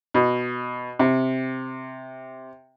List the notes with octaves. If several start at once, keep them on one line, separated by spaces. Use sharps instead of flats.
B2
C3